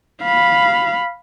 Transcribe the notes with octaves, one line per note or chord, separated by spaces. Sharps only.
F5 B5